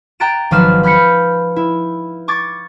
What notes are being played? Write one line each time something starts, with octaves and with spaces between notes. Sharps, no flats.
G5 A#5 F#6 A6 D7 E7
G#1 F3 F#3 B4 F6 E7
B5 F6 G6 B6 C#7
E4
C#6 D6 G#6 A6